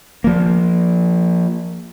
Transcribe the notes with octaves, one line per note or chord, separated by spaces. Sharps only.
F3 A#3